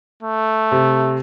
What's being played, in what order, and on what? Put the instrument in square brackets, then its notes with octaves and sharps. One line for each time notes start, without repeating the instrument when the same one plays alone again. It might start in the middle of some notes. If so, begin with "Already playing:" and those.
[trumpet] A3
[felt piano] C3